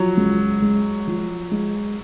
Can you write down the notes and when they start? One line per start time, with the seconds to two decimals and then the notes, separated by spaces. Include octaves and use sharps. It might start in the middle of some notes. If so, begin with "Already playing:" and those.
Already playing: F3 F#3
0.17 C#2
0.62 G#3
1.07 F3
1.51 G#3